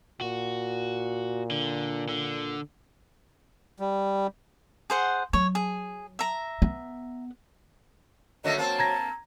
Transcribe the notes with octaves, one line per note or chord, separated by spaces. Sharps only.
A#2 F#4
D3
D3
G3
G#4 C5 F#5
F#3 C#5
G#4
E5 A#5
B3
D3 F#3 A3 A#3 D#5
A#3 C4 A5
A#5 G#6 A#6